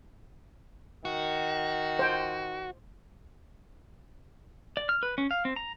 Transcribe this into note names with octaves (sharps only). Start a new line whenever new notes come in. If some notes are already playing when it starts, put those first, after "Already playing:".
D#3 F#4
C5 G5
D5
F6
B4
C#4
F5
C4
A#5